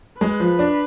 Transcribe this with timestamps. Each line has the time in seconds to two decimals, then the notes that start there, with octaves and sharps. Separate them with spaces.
0.21 G#3 B4
0.40 F3
0.59 D4